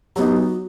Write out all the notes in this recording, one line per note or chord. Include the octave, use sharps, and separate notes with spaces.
F#3 B3 D#4 G4
F#4